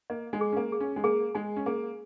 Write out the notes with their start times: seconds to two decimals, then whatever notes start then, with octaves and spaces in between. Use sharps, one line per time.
0.10 A#3 D#5
0.33 G#3
0.41 G#4
0.52 C#4
0.57 A#3
0.72 G#4
0.80 C#4
0.96 G#3
1.04 A#3 G#4
1.35 G#3 G#5
1.56 C#4
1.66 A#3 G#4